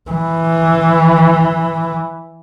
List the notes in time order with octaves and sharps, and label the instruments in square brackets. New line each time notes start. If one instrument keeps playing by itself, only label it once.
[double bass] E3